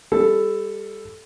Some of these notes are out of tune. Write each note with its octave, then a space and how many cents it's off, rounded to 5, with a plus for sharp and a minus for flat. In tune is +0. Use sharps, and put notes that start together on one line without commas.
G3 +25 A4 +0